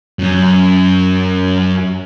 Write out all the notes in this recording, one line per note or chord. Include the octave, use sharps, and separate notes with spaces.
F#2 C#4